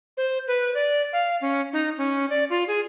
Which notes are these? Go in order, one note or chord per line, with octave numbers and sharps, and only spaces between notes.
C5
B4
D5
F5
C#4
D#4
C#4
D5
F4
G#4